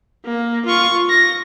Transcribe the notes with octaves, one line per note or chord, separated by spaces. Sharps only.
A#3
F4 C#6
A#6